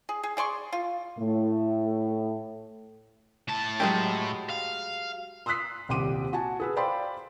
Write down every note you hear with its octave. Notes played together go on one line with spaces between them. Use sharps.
G#4
G#4
G#4 D5 C6 C#6
F4
A2 A3
A2 A5
F#3 G#3 G4
F5
C6 D#6 E6 F#6 B6 C7
D#1 C2 G4 C6 D6 D#7
F#4 G#5 A5
G#4 B4 E6
C5 D5 F5 G5 B5 C6